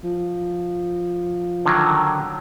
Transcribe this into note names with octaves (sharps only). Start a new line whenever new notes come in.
F3
D3 D#3 F#3